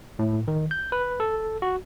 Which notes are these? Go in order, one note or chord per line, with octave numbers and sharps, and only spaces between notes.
A2
D#3
G6
B4
A4
F#4